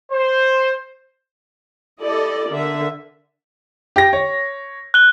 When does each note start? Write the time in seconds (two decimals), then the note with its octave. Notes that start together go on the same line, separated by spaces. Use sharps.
0.12 C5
1.99 E4 G4 A4 D5 D#5
2.48 D3 A#4 E5
3.96 G4 A#6
4.13 C#5
4.94 F#6 G7